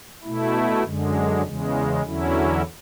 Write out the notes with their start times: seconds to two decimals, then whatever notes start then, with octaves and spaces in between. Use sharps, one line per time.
0.24 B2 A3 E4
0.84 F#2 D3 G#3
1.43 E2 C#3 G#3
2.02 E2 D3 F#3 C#4 E4